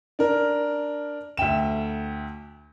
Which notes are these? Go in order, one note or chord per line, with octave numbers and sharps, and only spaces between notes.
D4 A#4
D2 E5 G5 E7